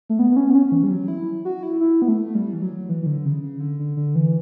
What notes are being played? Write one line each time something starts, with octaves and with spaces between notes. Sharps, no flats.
A3
B3
B3
C#4
B3
C#4
E3
G3
F#3
E4
F#4
E4
E4
B3
A3
G3
E3
F#3
E3
E3
D3
C#3
C#3
D3
D3
D3
E3